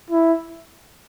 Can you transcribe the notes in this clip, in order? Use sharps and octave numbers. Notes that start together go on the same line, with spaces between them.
E4